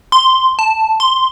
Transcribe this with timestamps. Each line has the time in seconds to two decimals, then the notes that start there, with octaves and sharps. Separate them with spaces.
0.12 C6
0.59 A5
1.00 C6